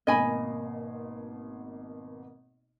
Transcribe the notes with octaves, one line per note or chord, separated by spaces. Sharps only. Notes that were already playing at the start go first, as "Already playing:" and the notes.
G#1 B2 A#3 D#5 G#5 B5